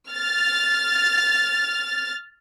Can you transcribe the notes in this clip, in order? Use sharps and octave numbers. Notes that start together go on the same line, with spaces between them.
F6 A6